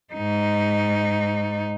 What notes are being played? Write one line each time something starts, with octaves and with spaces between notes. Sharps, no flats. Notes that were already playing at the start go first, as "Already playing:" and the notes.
G#2 D#4